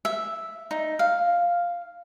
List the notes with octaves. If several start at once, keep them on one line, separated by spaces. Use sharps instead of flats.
E5
D#4
F5